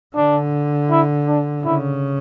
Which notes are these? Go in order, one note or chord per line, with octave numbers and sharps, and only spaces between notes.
D3 D4
E4
D4
C#3 E4